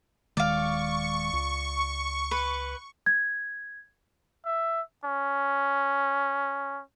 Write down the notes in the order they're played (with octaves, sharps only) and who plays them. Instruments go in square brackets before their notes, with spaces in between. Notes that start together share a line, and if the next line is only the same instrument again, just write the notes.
[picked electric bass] D#1 D#3 G#3 [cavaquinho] D5 F5 [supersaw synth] C#6
[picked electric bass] C#2
[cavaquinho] B4
[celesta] G#6
[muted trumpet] E5
C#4